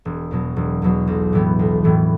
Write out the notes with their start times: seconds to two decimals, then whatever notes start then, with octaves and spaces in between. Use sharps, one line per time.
0.05 E1
0.31 E2 B2 F#3
0.56 E1
0.82 E2 B2 F#3
1.07 B1
1.33 A2 E3 B3
1.59 B1
1.84 A2 E3 B3